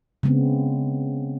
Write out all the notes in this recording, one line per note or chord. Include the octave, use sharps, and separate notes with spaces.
C#3 G#3 B3 C4